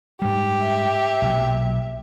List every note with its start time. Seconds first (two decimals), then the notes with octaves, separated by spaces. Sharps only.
0.22 G#2 G3 G4
0.63 E5
1.22 B1 A#2 F#3